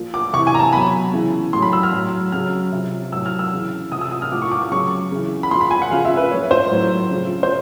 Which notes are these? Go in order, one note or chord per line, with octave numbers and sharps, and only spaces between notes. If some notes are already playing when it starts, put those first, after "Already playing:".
Already playing: A#2 F3
D6
C3 E3 C#6
G#5
A#5
A5
B2 F#3 B5
C#3 E3
A2 C6
F#3 B5
E6
F6
A2 F#3
C#3 F#3 F6
C3 F3
A2 F#3 E6
F6
E6
C#3 E3
C3 F3 D#6
E6
D#6
F6
A2 F3 D6
C#6
D6
D6
C#3 F#3 C#6
C#3 E3
B5
A#2 F3 C6
B5
G#5
F#5
C#3 F3 F5
E5
B4
A#2 F3 C#5
C5
A2 F#3
C#3 F3
C5